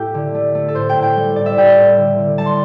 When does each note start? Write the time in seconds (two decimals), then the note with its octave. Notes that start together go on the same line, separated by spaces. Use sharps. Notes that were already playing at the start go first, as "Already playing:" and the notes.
Already playing: A2 A3 G4 E5 G5
0.14 D3
0.35 A3
0.55 A3
0.68 A4
0.75 A2 C5
0.89 G5
0.96 A2
1.03 G5
1.16 G3
1.36 A2 D5
1.46 E5
1.57 A2 G5
1.78 A2
1.98 D3
2.18 D3
2.38 G3 A5
2.46 C6